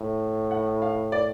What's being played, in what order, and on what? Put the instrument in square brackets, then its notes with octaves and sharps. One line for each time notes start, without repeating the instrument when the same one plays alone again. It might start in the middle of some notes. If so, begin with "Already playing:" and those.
Already playing: [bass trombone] A2
[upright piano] F#5
F5
D5